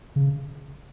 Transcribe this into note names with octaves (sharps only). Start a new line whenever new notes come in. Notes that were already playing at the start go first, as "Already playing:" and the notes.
C#3